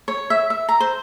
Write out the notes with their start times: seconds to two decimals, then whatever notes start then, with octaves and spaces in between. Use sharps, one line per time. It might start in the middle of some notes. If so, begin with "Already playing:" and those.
0.08 C#5
0.30 E5
0.50 E5
0.69 A#5
0.80 C5